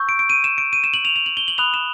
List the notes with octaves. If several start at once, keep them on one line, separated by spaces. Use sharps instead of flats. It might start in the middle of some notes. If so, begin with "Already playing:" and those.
Already playing: C#6 E6 G6
D7
D7
D#7
E7
D7
D#7
E7
F#7
F7
F7
F#7
G7
F#7
B5 D#6 F#6 F7
E7